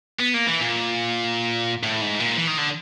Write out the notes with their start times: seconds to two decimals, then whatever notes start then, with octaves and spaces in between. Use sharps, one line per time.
0.19 B3
0.34 A#3
0.47 E3
0.61 A#2
1.83 A2
2.01 G#2
2.20 A#2
2.37 E3
2.48 D#3
2.58 D3